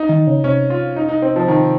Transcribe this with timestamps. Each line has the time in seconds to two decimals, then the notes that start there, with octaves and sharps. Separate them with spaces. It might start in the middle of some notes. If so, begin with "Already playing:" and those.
Already playing: D#4
0.09 D#3
0.27 C#3
0.44 C3 C#4
0.70 F4
0.96 D#4
1.09 D#4
1.22 C4
1.36 F3
1.48 D#3